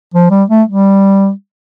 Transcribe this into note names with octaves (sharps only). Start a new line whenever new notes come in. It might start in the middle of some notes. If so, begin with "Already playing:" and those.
F3
G3
A3
G3